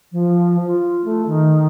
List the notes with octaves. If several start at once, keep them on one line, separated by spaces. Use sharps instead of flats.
F3
F4
A3
D#3